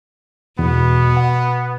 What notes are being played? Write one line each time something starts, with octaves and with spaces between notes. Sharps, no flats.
E2 B2 B3
F#5